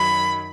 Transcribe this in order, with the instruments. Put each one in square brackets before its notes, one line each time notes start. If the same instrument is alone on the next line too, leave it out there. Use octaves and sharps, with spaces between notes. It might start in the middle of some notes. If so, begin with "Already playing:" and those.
Already playing: [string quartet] F#2 D#3 F#3 B5